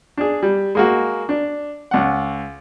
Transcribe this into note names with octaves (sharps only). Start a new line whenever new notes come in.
D4 G#4
G3
G#3 A#3 F#4
D4
C#2 F#5